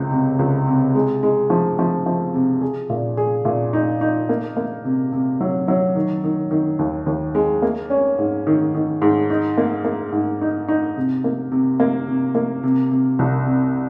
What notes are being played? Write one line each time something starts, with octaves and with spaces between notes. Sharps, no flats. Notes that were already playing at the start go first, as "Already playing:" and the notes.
Already playing: C#2 C4
C3
C#2
C3
G#3
G#3
F3
F3
F3
C3
G#4
A#2
G#4
A#2
D#4
D#4
A#3
A#3
C3
C3
F#3
F#3
D#3
D#3
D#3
D#2
D#2
G#3
A#3
C#4
G#2
D#3
D#3
G#2
D#4
A#3
A#3
G#2
D#4
D#4
C3
A#3
C3
A#3
C3
A#3
C3
C3
C2
C3